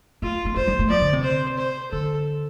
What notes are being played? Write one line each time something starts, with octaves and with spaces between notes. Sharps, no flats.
A3 F4
A3
G3 C5
G3
A3
F3 D5
D3
C3
C5
C5
D3 A4